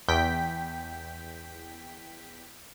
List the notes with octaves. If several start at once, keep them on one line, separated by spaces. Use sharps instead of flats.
E2 G5 B6